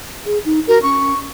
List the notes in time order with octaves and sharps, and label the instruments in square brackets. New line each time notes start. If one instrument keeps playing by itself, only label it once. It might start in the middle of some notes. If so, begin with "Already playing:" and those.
[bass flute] G#4
D#4
[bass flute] F#4 [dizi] A#4
[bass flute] C#4 [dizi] C#6